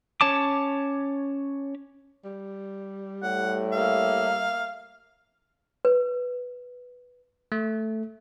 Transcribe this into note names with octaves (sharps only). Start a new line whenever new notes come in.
C#4 C#5 A5 D6
G3
A2 F#5
A#3 E5 F5
B4
A3